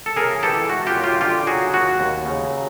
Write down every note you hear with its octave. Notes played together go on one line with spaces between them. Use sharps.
A4
C#3 G#4 A#4
E3 G4 A4
G#3 F#4
F4 G4
F#2
F4 G4
D3 F4 G4
F#3 F#4 G#4
D#2 F#4
D#2
C#3
F#3